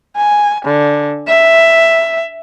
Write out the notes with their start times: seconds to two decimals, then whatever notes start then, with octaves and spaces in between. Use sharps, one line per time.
0.16 G#5
0.65 D3
1.28 E5